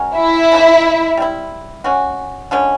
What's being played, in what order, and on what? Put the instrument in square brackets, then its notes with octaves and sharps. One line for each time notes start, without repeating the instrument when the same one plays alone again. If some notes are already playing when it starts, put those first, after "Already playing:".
Already playing: [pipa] G#3 C#4 F#4 A#4
[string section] E4
[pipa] C#3 F3 A#3 D#4
G3 C4 E4
G#3 C#4 F#4
D3 F3 G#3 C#4